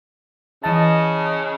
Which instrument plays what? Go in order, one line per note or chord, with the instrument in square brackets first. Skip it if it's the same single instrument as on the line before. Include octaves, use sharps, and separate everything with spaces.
[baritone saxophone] C#3 [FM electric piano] E3 A5 [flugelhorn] D#5